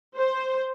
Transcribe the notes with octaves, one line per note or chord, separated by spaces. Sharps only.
C5